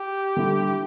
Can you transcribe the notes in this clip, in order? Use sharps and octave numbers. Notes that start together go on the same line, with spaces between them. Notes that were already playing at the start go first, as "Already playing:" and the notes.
Already playing: G4
D3 G3 E4